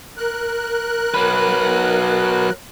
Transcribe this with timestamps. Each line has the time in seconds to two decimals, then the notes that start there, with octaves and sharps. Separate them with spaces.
0.17 A#4 F#6
1.14 F#3 B4